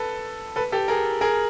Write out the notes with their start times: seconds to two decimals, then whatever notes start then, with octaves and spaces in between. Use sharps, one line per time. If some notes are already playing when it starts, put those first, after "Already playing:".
Already playing: A4 B4
0.56 A4 B4
0.72 G4 A4
0.88 G#4 A#4
1.21 G#4 A#4